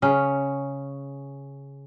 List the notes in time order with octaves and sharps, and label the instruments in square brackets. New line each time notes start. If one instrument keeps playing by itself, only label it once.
[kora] C#3 C#4